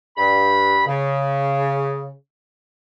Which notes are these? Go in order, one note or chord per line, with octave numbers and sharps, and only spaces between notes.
G2 B5
C#3